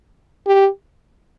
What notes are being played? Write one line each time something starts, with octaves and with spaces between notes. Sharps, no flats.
G4